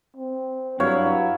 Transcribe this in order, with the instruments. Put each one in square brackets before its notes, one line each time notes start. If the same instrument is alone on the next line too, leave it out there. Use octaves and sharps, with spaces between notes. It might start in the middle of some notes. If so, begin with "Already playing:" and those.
[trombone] C4
[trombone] G2 [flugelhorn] F#3 [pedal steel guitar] E4 F5 F6 [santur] C#5